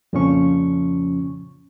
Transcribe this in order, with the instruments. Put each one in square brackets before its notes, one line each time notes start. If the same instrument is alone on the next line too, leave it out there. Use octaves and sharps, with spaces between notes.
[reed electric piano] F2 A#2 C#3 F3 C#4 C#6